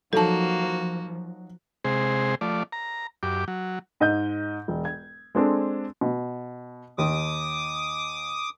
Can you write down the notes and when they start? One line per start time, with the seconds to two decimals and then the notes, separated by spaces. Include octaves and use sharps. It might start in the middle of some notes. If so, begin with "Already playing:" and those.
0.13 F3 F#3 A#3 D#4 F#4 A4 A5
1.85 C3 G#3 G#4 C5
2.41 F3 A3 D5
2.72 A#5
3.23 F#2 G4 D6
3.48 F#3
4.00 G#2 D#5 G6
4.68 E1
4.85 G#6
5.35 G#3 C4 D4 A4
6.01 B2
6.98 D#2 D#3 D6 D#6